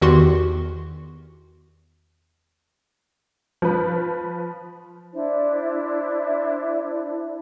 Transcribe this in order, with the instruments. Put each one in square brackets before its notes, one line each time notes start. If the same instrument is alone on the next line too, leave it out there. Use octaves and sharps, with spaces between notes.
[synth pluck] E2 D#3 F#4 G4 C6
[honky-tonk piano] F3 B4
[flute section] D4 E4 C5 D5